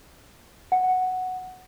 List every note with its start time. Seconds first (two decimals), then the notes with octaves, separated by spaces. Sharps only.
0.72 F#5